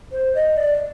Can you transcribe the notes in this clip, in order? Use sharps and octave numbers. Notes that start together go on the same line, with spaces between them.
C5
D#5
D5